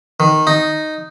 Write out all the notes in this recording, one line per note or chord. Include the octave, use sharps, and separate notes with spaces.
D#3
D#4